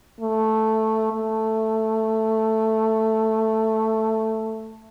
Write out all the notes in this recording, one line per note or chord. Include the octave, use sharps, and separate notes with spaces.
A3
A3